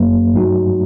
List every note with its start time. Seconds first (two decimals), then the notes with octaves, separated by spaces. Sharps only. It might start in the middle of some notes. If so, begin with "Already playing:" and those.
Already playing: F#2 F#3 A#3
0.34 G2 F#3 A3 D#4 F#4